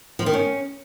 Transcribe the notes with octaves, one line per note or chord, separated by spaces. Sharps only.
F3
D#3
C#4